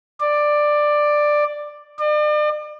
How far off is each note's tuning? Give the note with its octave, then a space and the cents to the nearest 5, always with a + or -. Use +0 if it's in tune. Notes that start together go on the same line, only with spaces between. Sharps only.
D5 +10
D5 +40